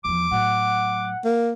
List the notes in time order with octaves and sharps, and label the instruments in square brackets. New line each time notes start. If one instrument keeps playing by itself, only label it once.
[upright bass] E2 F3 [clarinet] D6
[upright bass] A2 F#3 [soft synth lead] F#5
[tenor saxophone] A#3